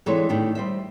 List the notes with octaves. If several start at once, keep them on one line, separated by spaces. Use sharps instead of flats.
D3 E3 G#3 C4 A4 C#5
A2 D3 D#3 D4 G4
G3 C5 D#5 E5